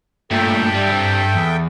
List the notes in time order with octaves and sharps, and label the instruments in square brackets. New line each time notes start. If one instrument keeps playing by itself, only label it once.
[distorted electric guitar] G2 [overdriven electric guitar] A#2 A3 [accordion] A4 E5 G5
[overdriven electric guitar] G3
G3 C4
E2